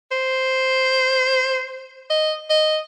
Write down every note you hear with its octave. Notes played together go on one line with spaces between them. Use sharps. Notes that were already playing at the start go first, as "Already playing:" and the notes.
C5
D#5
D#5